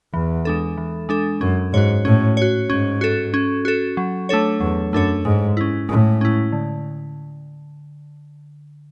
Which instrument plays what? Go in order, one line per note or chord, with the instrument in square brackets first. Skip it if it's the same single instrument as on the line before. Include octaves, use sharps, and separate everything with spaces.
[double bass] E2 [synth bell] E3
[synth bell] G#3 D4 A4
E3
G#3 D4 A4
[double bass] F#2 [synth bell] C#4
[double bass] G#2 [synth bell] F#4 C#5
[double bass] A2 [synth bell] C#4
[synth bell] F#4 C#5
[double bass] G#2 [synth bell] C#4
[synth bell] F#4 A4
C#4
F#4 A4
F#3
A3 D4 A4 C#5
[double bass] E2 [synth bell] F#3
[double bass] F#2 [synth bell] A3 D4 A4 C#5
[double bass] G#2 [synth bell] G#3
[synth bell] C#4 E4
[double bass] A2 [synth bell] G#3
[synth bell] C#4 E4
D3